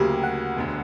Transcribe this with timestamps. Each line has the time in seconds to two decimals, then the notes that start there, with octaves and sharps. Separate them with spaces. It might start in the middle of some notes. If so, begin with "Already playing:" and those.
Already playing: D2 C#3 F#3 A#3 G4
0.23 F#5
0.57 E1 D2 D3